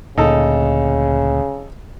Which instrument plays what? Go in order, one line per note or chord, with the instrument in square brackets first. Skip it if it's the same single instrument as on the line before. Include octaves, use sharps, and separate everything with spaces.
[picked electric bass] D2 A#2 [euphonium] C#3 [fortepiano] D#4 A4